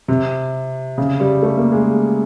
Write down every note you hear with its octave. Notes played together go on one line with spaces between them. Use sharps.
C3
C#3
G3
A3
A#3
G#3